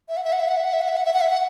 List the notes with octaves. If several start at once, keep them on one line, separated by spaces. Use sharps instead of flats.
E5
F#5
E5
F#5
E5
F#5
E5
F#5
E5
F#5
E5
F#5
E5
F#5
E5
F#5